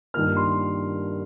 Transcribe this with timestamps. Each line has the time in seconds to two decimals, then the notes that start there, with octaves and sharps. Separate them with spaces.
0.14 G2 D#3 A#3 F6
0.36 C6